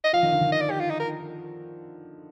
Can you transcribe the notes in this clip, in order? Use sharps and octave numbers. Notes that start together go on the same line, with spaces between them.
D#5
F3 F5
D#3
D3
D#3
D#5
D5
G4
F4
D#4
A#4